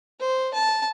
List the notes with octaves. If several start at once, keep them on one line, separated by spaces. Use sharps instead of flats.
C5
A5